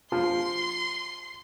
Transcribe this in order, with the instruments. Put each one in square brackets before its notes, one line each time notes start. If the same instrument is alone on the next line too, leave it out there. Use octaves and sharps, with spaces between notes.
[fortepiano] F3 [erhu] C6